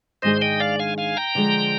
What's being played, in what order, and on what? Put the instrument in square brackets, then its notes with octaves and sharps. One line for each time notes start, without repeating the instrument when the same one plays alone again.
[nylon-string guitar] G#2 D#3 G#3 D4 G#4 [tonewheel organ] C5 D#5
[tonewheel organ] D#5 G5
D5 F5
F5 G#5
F5 G#5
G5 A#5
[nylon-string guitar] D3 F3 G#3